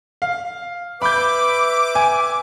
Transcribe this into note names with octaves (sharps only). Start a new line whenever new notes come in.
F5
B4 E5 B5 D6 G6
G#5